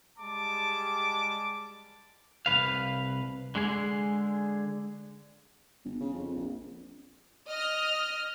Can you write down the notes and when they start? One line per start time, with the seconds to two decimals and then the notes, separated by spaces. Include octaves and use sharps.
0.18 G3 G#3 A5 D6
2.46 C2 B2 B4 F5
3.55 D3 G#3 G#4
5.85 G1
6.00 C#3
6.14 F2
6.35 A#1
7.48 D#5 F6